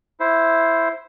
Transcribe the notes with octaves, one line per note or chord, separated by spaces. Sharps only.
E4 C5